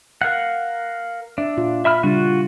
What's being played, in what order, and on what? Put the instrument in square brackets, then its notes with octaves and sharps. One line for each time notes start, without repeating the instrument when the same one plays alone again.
[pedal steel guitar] A#4 F5 F#5
[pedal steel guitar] D4 [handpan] E5
[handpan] A#2 F4
[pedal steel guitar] E5 B5 F6
[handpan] C#3 G3 D4 [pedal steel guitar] F4 F#4